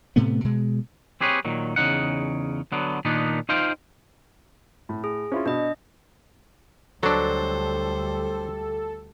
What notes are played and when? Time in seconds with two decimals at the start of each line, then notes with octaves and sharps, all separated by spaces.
0.16 A2 C3 A3 B3
0.44 B2 G#3
1.21 C4 G4 G#4 B4 C#5
1.45 A#2 D#3 F#3
1.76 E2 C#3 F3 D#4 F#5
2.72 D3 F#3 B3
3.05 A#2 D#3 B3 D4 D#4
3.49 D#4 F4 C5 F5 G5
4.89 A2
5.04 G#4
5.32 C#4 E4 F4
5.46 B2 D4 D#5
7.03 D2 F#3 G3 D4 A4 C5